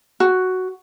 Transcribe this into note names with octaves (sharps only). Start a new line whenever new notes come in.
F#4